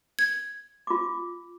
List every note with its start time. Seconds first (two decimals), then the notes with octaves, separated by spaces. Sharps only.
0.19 G#6
0.87 F4 D6